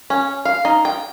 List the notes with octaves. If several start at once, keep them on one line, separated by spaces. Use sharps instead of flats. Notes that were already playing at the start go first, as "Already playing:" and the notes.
C#4
F5
D#4
G5